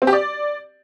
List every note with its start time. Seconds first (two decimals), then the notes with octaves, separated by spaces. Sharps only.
0.02 C4
0.07 G4
0.13 D5